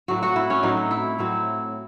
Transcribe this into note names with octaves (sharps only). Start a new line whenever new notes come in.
A2 F#3 C4 F#4
F#4
E4
C#4
A2 F#3 C4 D#4
E4
A2 F#3 C4